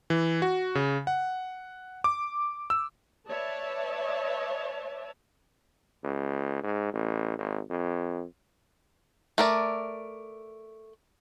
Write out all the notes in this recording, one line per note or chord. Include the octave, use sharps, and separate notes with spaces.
E3
F#4
C#3
F#5
D6
E6
B4 C#5 D5 E5 A5
C#2
G#2
A1
G#1
F2
A3 A#4 D5